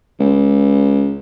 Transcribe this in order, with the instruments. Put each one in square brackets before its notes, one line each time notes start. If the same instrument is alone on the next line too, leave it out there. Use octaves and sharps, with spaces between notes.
[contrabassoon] C#2